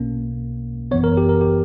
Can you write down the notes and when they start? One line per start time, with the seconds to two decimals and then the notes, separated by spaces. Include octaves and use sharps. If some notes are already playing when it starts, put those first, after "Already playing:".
Already playing: B1 B2 A#3 C#4
0.91 G1 F#2 E3 B3 C#5
1.04 A#4
1.17 G4
1.29 A#4
1.41 G4